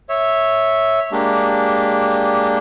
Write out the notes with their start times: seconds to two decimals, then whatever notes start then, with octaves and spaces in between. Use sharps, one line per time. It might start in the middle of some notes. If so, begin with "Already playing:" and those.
0.09 C#5 E5
1.12 G#3 A#3 D4 G4